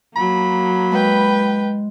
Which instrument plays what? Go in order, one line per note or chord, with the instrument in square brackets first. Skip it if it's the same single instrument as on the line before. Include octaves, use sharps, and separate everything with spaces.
[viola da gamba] F#3 A#3 [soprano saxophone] B5
[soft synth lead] G#3 [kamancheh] B4 G5